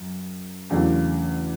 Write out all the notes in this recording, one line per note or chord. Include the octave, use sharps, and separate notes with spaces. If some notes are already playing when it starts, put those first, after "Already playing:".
Already playing: F#2
E2 C#3 F#3 A3 D4